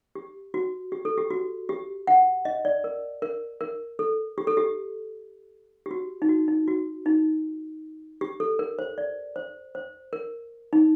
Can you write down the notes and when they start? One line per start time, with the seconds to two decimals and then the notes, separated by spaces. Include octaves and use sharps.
0.15 G4
0.54 F#4
0.92 G4
1.05 A4
1.18 G4
1.30 F#4
1.69 G4
2.07 F#5
2.45 D#5
2.65 D5
2.84 A#4
3.22 A#4
3.61 A#4
3.99 A4
4.38 G4
4.47 A4
4.57 G4
5.86 G4
5.91 F#4
6.22 D#4
6.29 F#4
6.48 D#4
6.68 F#4
7.06 D#4
8.21 G4
8.40 A4
8.59 A#4
8.79 C5
8.98 D5
9.36 C5
9.75 C5
10.13 A#4
10.73 D#4